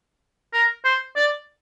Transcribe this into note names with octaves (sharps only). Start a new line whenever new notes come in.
A#4
C5
D5